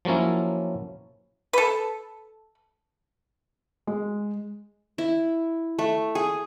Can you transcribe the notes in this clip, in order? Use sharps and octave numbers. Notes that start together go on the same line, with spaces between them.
F3 F#3 A#3 C#4 E4
A4 B4
G#3
E4
A3
G#4